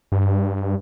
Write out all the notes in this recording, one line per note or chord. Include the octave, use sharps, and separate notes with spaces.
G2